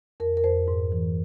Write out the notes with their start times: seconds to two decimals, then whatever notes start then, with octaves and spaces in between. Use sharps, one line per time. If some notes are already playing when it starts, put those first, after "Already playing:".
0.20 F2 A#4
0.37 A#4
0.44 F2 C5
0.68 G#2
0.92 E3